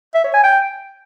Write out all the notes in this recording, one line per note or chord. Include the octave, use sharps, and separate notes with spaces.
E5
C#5
G#5
G5